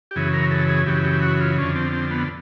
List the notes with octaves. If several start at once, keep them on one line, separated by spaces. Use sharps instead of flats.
G4
F#2 C#3 E3 G#4
A#4
A4
G#4
F#2 C#3 E3 G4
G4
F#4
F4
F2 D3 C#4
C4
C4
B3